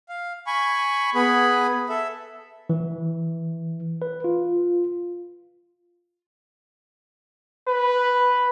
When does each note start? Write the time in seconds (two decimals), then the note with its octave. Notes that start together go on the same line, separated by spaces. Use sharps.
0.09 F5
0.47 G#5 B5 C#6
1.15 B3 G#4 B5
1.89 A4 E5
2.70 E3
4.02 B4
4.24 F4
7.68 B4